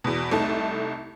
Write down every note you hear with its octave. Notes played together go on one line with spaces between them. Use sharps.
E2 B2
C2 A3 D#4 A5